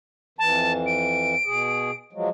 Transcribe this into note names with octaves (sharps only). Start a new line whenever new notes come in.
F2 E3 A5
D7
B2 G#4
F3 F#3 G#3